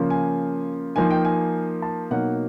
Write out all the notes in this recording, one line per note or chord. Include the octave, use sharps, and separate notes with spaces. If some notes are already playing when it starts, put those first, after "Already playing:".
Already playing: C#3 F3 A#3
G#5
F3 A#3 D#4 G#5
G5
G#5
A5
B2 F#3 A#3 D#4 F#5